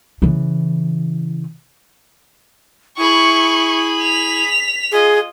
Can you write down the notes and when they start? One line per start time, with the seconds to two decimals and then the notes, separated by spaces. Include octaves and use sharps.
0.22 C#3 E3
2.98 E4 G#4 B5 C#6
4.00 B6 F7
4.92 F4 G#4 D#5